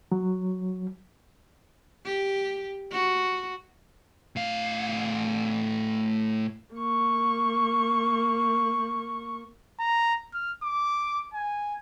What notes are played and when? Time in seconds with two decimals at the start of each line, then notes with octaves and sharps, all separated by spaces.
0.12 F#3
2.05 G4
2.92 F#4
4.36 A2 F5
6.74 A#3 C#6
9.80 A#5
10.34 F6
10.63 D6
11.33 G#5